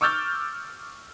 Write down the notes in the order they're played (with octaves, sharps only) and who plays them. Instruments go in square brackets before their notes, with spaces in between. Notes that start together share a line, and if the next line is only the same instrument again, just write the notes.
[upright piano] C#6 D6 E6 F6 G6 A6